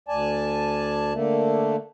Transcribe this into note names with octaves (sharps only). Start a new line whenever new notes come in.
D2 D5 G#5 A5
D3 A3 A#3